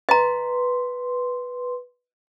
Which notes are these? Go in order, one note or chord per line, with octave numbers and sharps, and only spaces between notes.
B4 D#5 A#5 C6